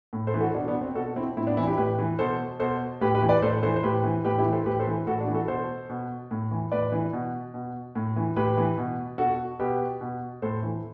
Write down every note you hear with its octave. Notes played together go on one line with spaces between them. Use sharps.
A2
A4 C5
E3
F#4 A4
B2 D4 F#4
B3 D4
C4
B2 F#4 A4
C4 E4
A2 C4 E4
B3 D4
E3 C4 E4
E4 G4
A2 G4 B4
E3
B2 A4 C5
B2 A4 C5
A2 G4 B4
G4 B4
E3
B4 D5
A2 A4 C5
E3 A4 C5
C5
A2 G4 B4
E3
A2 G4 B4
E4 G4
E3
A4 C5
A2 G4 B4
A4 C5
E3
A2 F#4 A4
D4 F#4
E3
F#4 A4
B2 A4 C5
B2
A2
E3
A2 B4 D5
E3
B2
B2
A2
E3
A2 G4 B4
E3
B2
B2 F#4 A4
B2 G4 B4
B2
A2 A4 C5
E3